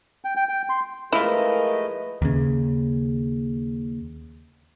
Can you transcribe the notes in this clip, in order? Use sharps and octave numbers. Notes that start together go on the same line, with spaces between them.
G5
G5
G5
C6
F3 G#3 A3 E4 F4 A#4 B4 D#5
D#2 C#3